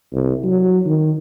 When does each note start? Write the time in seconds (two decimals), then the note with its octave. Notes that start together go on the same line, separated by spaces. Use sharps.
0.13 C2
0.44 F#3
0.86 D#3